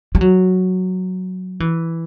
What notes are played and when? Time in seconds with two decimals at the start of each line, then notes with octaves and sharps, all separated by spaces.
0.15 G3
0.21 F#3
1.60 E3